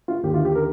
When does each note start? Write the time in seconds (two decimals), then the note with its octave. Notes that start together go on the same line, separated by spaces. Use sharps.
0.08 F4
0.23 D#2 G4
0.28 D3
0.34 F4
0.45 G4
0.55 A#4